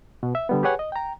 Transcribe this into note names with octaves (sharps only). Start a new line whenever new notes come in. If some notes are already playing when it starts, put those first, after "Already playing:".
B2
E5
D3 G3 B3
G4 G#4 B4 C#5 F#5 G#5
D#5
G5 A#5